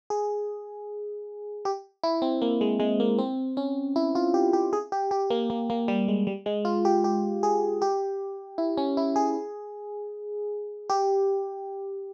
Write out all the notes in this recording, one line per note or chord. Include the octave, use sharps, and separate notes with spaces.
G#4
G4
E4
C4
A#3
G#3
G#3
A#3
C4
C#4
E4
F4
G4
G4
G#4
G4
G4
A#3
A#3
A#3
G3
G#3
G3
G#3
F4
G4
G4
G#4
G4
E4
C#4
E4
G#4
G4